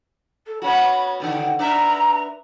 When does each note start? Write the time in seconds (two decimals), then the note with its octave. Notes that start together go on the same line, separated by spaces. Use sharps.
0.46 A4
0.62 B3 C#4 F#4 B5
1.20 B2 D3 D#3 G5
1.59 D4 B4 E5 A#5